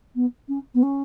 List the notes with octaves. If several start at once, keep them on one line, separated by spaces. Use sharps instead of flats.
B3
C#4
B3
C#4